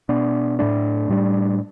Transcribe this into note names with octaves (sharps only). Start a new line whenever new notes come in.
B2 B3 D4
A2 A3 D4
A2 G3 D4